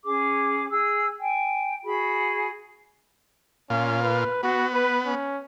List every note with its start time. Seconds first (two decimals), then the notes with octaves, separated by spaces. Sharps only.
0.04 C#4 G#4 D6
0.70 G#4 E6
1.19 G5 G#5
1.84 F#4 G#4 B5
3.70 A#2 C#4 F4
4.02 B4
4.43 B3 F#4
4.73 B4
5.06 C#4